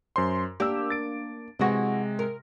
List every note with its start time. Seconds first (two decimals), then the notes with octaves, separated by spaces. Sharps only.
0.16 F#2 C5 C6
0.60 A#3 D4 G4 E6
0.90 A6 D7
1.59 C3 E3 G#3 F#4 A#6
2.19 A#4